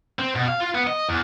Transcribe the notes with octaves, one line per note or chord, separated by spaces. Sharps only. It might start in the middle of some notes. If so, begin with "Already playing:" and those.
C4
B2
F5
F4
B3
D#5
E2